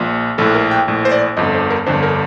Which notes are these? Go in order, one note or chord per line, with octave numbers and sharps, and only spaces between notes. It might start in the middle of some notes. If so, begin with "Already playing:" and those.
Already playing: A#1 A#2
A#1 A2 A4
A#4
G5
A#1 A2
C5
D5
G1 F2 D3 D#5
C5
A#4
G1 F2 D3 C5
A#4